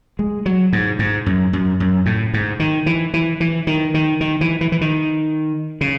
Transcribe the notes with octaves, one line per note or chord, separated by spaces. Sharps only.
G#3
F#3
G#2
G#2
F#2
F#2
F#2
A2
G#2
D#3
E3
E3
E3
D#3
D#3
D#3
E3
E3
E3
D#3
C#3